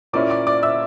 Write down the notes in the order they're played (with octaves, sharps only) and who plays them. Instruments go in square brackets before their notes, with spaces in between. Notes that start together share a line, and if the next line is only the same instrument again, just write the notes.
[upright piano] A#2 A#3 C#4 E4 D5 D6
D5 D6
D5 D6
E5 E6